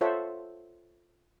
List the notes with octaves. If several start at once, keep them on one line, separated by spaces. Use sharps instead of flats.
F4 A4 C5 C#5 E5 F#5